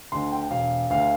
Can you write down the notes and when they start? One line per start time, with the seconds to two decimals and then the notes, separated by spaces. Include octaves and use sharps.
0.12 D2 D3 C6
0.32 G5
0.51 E1 F5
0.90 D2 D3 F5